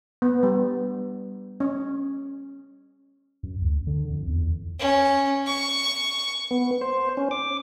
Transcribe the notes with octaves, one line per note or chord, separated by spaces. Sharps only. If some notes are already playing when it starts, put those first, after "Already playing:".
B3
G3
C#4
F#2
D2
D3
F2
E2
C#4
C#6
B3
C5
C#4
D6